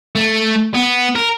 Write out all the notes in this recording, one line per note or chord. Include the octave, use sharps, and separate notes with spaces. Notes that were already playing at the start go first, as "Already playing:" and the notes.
A3
B3
A#4